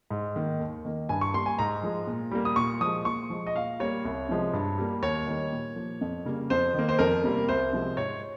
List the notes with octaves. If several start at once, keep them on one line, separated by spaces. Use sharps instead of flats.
G#2
D#3 A#3
D#2
D#3 A#3
G2 G#5
C#6
G3 A#3 C6
G#5
G#2 A#5
F3 G#3
A#2
G3 A#3
D#6
A#2 C#6
F3 G#3 D#6
A#2 C#6
F3 G#3
D#5
A#2 F5
G3 A#3 C#5
C2
C3 F3 G#3
G2
G3 A#3
D#2 C#5
D#3 G3 A#3
A#2
F3 A#3
F2
C#3 G3 A#3
F2 C5
D#3 A#3
C5
F2 A#4
C3 G3 A#3
C2 C5
C3 F3 G#3
G#2 C#5